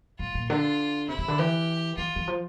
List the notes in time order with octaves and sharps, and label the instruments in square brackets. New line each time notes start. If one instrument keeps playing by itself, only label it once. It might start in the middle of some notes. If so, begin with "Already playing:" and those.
[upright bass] A2 [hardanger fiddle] F4
[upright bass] A#2
[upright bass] D3 [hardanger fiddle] F4
[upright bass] C3 [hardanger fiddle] E4
[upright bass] C3
D3
[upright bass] E3 [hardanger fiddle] G4
[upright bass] E3 [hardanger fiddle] F4
[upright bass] E3
F3